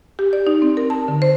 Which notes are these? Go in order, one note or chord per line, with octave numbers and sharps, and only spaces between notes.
G4
D5
D#4
C4
A#4
A5
D3
C5